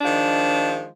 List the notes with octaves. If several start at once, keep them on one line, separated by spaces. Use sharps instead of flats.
D#3 F3 G#3 D4